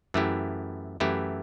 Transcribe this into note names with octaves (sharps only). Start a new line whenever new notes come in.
F#2 E3 A3 E4 G4
F#2 E3 A3 E4 G4